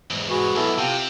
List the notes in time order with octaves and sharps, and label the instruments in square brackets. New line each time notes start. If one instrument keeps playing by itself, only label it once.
[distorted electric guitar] E2 G#2
[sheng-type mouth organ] F#4 G#4 B4
[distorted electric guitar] B1 [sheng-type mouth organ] B3 E4 A4
[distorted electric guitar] C3 [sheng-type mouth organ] F4 G4